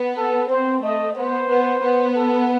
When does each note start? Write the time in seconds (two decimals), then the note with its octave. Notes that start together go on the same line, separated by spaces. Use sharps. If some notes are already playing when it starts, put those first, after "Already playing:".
Already playing: B3
0.17 A4
0.49 C4 C5
0.82 A3 D#5
1.15 B3 C5
1.49 B3
1.82 B3
2.15 A4